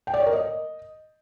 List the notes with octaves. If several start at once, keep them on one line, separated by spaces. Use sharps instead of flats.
G5
D5
C#5
A#4
D#5